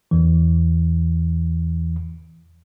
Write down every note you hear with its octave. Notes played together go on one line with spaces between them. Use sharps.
E2 E3